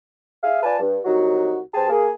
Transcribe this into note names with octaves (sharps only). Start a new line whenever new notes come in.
G#4 E5 F5
F4 B4 D5 F5 G#5 A5
G2
C2 F#3 D#4 F#4
G2 G#4 C5 G5 A5
A#3 G#4